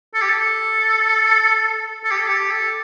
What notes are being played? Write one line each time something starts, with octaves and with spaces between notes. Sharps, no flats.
A4
G4
A4
A4
G4
A4
G4
A4